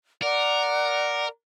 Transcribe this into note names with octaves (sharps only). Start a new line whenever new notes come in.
A#4 D5 F#5 D6